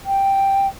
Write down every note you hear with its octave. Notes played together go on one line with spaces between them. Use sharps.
G5